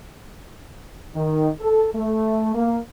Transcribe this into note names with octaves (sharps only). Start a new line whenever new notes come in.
D#3
A4
A3
A#3